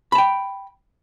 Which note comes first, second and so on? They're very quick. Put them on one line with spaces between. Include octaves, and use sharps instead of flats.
B5 A5 G5